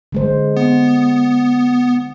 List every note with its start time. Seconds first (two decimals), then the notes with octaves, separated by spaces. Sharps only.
0.12 D3 G#3 C5
0.57 B3